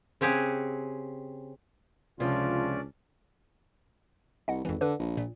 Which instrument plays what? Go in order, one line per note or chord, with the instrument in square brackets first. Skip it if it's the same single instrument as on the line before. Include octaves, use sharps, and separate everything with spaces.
[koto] C#3 C4 G4 G#4 F#5
[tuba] C#2 [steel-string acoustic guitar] C3 F3 [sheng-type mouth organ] C#4 D4 D5 [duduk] F4
[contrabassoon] C2 [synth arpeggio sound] D#5 F#5
[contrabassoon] G#1 [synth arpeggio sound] F2 E3
[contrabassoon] D3 [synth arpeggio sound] B4
[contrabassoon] A#1
[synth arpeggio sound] A#2